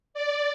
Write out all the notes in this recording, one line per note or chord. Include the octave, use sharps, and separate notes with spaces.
D5